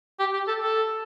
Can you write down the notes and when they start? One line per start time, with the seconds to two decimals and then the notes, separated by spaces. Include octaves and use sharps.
0.19 G4
0.33 G4
0.48 A4
0.61 A4